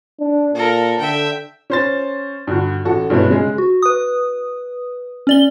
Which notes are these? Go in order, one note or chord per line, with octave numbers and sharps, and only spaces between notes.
D4
A#2 A4 A#4
D3 E5 G5
C#4 C5 A6
G2 D3 F#4
A1 F#4 A4
G2 B2 G#3 B3 C#4 E4
C#3 G#3 G#4
F#4
B4 D#6
C#4 D5 G7